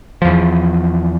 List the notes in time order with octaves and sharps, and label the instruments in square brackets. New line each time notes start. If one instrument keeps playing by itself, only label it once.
[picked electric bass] E2 F3